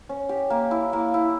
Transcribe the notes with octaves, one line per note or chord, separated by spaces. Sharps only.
C#4
G4
A#3
E4
A#3
E4